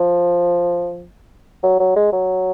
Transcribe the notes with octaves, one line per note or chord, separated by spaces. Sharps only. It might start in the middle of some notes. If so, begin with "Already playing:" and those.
Already playing: F3
F#3
F#3
G#3
F#3